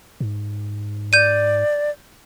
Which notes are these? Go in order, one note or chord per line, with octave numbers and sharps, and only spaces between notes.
G#2
D5 G6 D#7